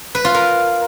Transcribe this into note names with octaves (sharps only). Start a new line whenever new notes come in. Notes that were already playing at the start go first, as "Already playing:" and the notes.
B4
F4
A#4